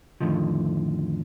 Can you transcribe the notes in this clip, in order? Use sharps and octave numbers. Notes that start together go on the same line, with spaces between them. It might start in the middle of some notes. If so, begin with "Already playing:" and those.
F2 A2 D3 D#3 F3